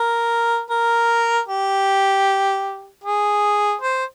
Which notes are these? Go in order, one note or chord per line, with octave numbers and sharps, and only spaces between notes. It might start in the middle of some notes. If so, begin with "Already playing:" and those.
Already playing: A#4
A#4
G4
G#4
C5